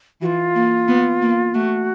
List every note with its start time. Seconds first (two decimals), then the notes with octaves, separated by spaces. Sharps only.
0.21 E3 F#4
0.26 F4
0.55 A#3
0.88 B3
1.21 A#3
1.54 A3 F#4